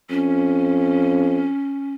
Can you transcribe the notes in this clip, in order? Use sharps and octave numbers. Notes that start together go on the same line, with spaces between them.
F2 C#4